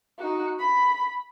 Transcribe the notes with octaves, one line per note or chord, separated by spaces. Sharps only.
D#4 F#4
B5